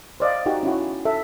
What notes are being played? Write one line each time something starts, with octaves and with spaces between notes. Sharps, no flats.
C5 D5 D#5 F5
D#4 F#4 G4
C#4 E4 F#4
A4 E5